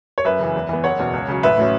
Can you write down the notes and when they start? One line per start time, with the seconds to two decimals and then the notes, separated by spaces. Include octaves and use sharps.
0.18 C#5
0.25 F#2 B4 E5
0.39 C#3 E3
0.55 E2
0.69 E3 B3
0.84 F#1 C#5 F#5
0.99 E2 B2
1.13 C#2
1.28 C#3 F#3
1.43 A1 B4 E5
1.58 A2 F#3 C#4